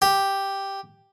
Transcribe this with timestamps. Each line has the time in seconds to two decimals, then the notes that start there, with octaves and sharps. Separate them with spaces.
0.02 G4